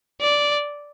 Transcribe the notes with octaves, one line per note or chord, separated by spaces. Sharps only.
D5